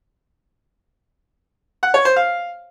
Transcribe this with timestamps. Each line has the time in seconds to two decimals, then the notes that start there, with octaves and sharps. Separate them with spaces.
1.83 F#5
1.94 C#5
2.05 C5
2.16 F5